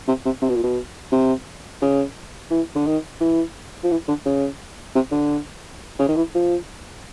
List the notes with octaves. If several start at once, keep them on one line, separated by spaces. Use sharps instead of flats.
C3
C3
C3
B2
A#2
B2
C3
C#3
E3
D3
D#3
E3
F3
E3
D3
C#3
C3
D3
C#3
D#3
E3
F3